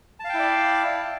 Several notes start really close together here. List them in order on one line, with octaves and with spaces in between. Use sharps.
A5 F5 G5 E4 D5